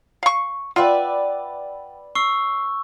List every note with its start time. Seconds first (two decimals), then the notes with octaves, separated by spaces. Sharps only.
0.23 F5 C#6
0.76 F4 B4 D5 E5 F#5 G5
2.15 C#6 E6 C7 G7